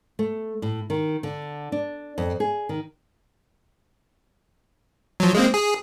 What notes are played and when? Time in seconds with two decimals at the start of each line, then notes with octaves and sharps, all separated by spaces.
0.19 A3
0.62 A2
0.90 D#3
1.23 D3
1.72 D4
2.18 F2
2.40 G#4
2.69 D#3
5.20 F3 F#3
5.35 G#3 A#3 C4
5.54 G#4